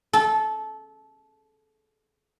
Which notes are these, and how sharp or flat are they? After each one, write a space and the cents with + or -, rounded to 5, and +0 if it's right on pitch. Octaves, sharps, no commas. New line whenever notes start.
A4 -20